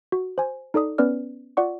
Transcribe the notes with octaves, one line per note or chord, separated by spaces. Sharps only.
F#4
C5 G#5
D#4 A4 D5 D#6
B3 C#4 B4 D5 F6
F4 D5 F#5 C#6